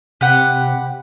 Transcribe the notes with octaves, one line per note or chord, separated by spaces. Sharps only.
C3 G4 B4 F#5